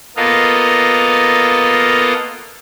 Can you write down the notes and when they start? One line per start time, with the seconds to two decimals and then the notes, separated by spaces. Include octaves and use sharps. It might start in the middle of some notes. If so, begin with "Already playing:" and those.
0.17 A#3 B3 F4 A4 D#5 F5